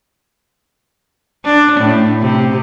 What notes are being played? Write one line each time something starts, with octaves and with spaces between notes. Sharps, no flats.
D4
A2
C3